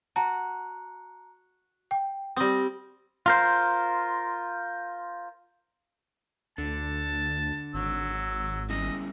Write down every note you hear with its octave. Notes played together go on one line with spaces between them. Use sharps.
F#4 A5 A#5
G5
G3 C4 D#6 A#6
F4 A#4 C5
D2 D3 A5
G#1 F#3 E6
G3 C#4 E4 D#5